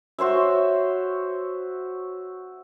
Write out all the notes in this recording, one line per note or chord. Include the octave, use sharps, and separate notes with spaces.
F#4 C5 C#5 E5